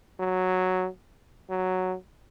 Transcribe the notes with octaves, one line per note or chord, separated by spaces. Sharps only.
F#3
F#3